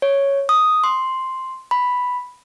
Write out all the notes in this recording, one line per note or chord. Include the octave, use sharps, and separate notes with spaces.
C#5
D#6
C6
B5